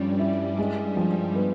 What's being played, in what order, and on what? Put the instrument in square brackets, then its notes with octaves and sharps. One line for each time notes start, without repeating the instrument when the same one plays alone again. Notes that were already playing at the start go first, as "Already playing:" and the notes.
Already playing: [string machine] G2 G3 [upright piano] F3 C#4
[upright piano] E4
G#3
F3
B3